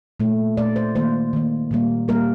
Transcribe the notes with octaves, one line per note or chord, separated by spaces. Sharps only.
A#2 A3
A#2 A3 D5
C5
D#3 A#3 C5
D#3 A#3
A#2 G3 A#3
A#2 G3 A#3 A#4